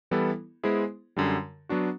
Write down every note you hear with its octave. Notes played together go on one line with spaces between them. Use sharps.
E3 G3 B3 E4 A4
G#3 B3 E4 G#4 C5
F#2 D3 G3
F#3 B3 D4 F#4